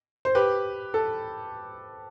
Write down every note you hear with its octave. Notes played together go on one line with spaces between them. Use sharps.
C5
G4 B4
A4